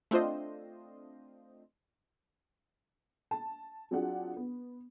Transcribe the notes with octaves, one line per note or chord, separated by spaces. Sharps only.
A3 C4 D4 F4 C5 D#5
A5
F#3 C4 D4 F4 G#4 F#5
B3